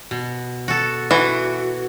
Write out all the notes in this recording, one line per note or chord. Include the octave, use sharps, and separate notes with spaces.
B2
F#4 A4
E3 F#4